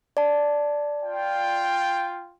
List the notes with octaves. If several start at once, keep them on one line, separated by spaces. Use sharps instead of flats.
D5 A5
F4 G5